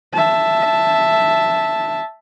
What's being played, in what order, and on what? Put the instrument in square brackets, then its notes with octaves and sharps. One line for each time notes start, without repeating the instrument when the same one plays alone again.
[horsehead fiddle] E5 A5